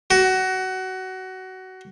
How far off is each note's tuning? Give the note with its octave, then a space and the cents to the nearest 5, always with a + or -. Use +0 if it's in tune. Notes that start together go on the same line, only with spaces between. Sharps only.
F#4 +20